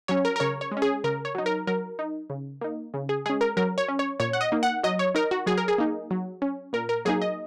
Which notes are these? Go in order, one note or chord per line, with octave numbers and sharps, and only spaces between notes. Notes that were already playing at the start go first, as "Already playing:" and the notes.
F#3 C#4 C#5
A#4
A#4
C#3 C#5
C#5
G#3
C#4
G#4
C#3 A#4
C#5
F#3 D#4
A#4
F#3 A#4
D#4
C#3
A#3 D#4
C#3
G#4
G#3 C#4 G#4
A#4
F#3 A#4
C#5
C#4
C#5
A#2 C#5
F#5
D#5
A#3 D#4
F#5
F#3 D#5
C#5
D#4 A#4
F#4
F#3 G#4
A#4
G#4
A#3 D#4
F#3
C#4
A#2 A#4
A#4
F#3 A#3 D#4 G#4
D#5